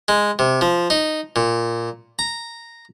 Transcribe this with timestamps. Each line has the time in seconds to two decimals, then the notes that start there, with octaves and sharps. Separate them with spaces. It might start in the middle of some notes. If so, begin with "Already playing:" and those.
0.08 G#3
0.39 C3
0.61 F3
0.90 D#4
1.36 A#2
2.19 A#5